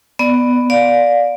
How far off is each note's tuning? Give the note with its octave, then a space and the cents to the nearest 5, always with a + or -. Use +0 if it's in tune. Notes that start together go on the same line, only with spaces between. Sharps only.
B3 +5 D5 +10
D5 -5 F5 +20